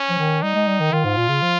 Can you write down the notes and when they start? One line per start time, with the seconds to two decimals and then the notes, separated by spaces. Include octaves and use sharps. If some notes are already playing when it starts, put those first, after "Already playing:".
Already playing: C#4
0.10 F3
0.19 D#3
0.42 G3 D#4
0.55 G#3
0.67 G3
0.80 D#3
0.92 D#3 F4
1.04 G#2
1.17 A#2
1.29 C#3
1.42 F3